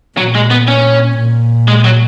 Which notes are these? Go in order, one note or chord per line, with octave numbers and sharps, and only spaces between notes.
A#2 F#3
G#3
B3
C#4
A#2
G#3
F#3